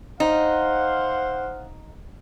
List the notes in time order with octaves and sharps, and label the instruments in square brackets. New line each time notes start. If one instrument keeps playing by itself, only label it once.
[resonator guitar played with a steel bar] D#4 [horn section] C5 F5 F#5